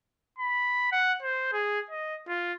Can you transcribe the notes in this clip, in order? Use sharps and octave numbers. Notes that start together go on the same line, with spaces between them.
B5
F#5
C5
G#4
D#5
F4